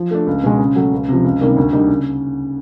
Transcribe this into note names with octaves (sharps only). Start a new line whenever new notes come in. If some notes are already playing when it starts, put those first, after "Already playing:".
Already playing: F3
A3 D4
C#2
B2 G#3
C#3
F#3 A3
C#2
C3 F3
C#2
C3 D#3 G3 A#3
D2
D3 G3 A#3 D#4
C#3